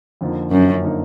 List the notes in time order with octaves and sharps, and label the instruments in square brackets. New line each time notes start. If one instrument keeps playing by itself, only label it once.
[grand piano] F2 D3 F3 A#3 D#4
[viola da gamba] F#2
[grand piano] D3 F3 A#3 D#4